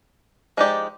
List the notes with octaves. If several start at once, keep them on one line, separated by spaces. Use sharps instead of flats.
F3 G#3 D#4 G4 D5